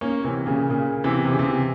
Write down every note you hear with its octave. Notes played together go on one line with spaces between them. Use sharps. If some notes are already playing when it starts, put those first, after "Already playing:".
A#3 C#4
C3 E3
A#2 C#3
A#2 C#3
C3 E3
C3
C#3
C3 E3